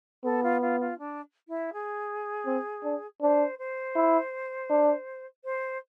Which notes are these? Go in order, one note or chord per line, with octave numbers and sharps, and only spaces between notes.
B3 A4
F4
F4
F4
D4
E4
G#4
C4
D4
D4 C5
C5
E4
D4
C5